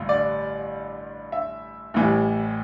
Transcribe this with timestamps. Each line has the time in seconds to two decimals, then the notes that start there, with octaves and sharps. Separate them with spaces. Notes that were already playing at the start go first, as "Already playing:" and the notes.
Already playing: A1 G2 D3
0.09 D5
1.32 E5
1.94 A1 A2 E3 G3